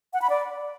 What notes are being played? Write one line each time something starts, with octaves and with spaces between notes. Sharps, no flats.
F#5
B5
D5